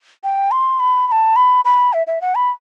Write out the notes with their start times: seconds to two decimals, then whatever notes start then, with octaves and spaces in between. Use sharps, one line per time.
0.24 G5
0.51 C6
0.80 B5
1.08 B5
1.12 A5
1.36 B5
1.65 B5
1.93 E5
2.07 E5
2.21 F#5
2.35 B5